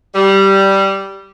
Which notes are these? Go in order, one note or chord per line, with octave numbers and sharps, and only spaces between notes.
G3